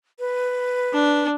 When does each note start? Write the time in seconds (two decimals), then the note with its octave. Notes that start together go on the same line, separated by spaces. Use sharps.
0.19 B4
0.93 D4